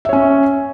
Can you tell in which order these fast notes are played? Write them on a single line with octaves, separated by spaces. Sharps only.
E5 C#5 C#4